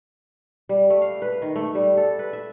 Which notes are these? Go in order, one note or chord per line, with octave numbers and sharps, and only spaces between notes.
G3
A3
F5
B4
D#3
A3
G3
A4
B4
E5